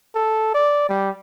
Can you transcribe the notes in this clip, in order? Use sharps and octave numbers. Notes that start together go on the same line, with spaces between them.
A4
D5
G3